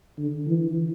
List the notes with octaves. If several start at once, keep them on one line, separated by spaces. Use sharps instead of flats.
D3
E3